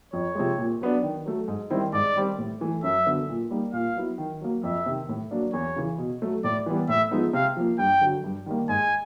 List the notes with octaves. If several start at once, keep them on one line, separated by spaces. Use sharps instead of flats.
F2 C#5
C3 F3 G#3
A#2
F#3 B3 D4
D#3
F#3 A3
G#2
D#3 G3 C4 E4
G#2 D5
D#3 G3 C4
A2
E3 A3
F#2 E5
D3 F#3 B3
A#2
G3 A#3 D#4
A#2 F5
F#3 B3 E4
D#3
F#3 A#3
F2 E5
C3 D#3
A2
F#3 A#3 D4
E2 C#5
C#3 E3
B2
F#3 A3
A2 D5
E3 G3 B3
A2 E5
F3 G#3 B3 D#4
C3 F5
F3 A#3
G2 G5
D3 F#3
G2
D#3 G3 A#3
G#2 G#5